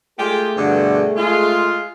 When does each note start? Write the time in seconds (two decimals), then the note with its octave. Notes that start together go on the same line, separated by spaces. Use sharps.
0.19 G#3 A3 F4 G4 G#4
0.57 G2 B2 D3
1.17 G#3 F4